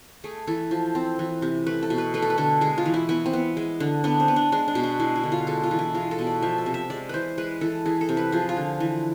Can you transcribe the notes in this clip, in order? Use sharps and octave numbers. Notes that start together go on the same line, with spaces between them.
A3 G#4
E3 A4
F3
C4
E3
C3
A3 B4
A4
B2
B4
A3 B4
A4
B4
D3 A4
G#3 G#4
F4
E3
E4
B3 E4
C4
B3
G#3
D3
B3 D4
C4
B3
D4
G#3 D4
D4
B2
D4
G#3 E4
E4
D3
F4
G#3 A4
F4
E3
E4
G#3 F4
A4
B2
D5
F3 E5
E5
C3
E5
G#3 D5
E3 B4 C5
G#3 B4
E3 A4
E3 G#4
A4
C3
B4
F3 G#4
F4
D3
E3